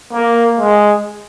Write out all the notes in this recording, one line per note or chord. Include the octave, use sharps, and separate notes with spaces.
A#3
G#3